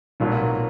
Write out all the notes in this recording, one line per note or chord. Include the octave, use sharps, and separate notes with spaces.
B1 A#2 F#3